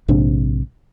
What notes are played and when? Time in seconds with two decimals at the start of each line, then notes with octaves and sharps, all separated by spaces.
0.08 A#1 G#2 C3 D4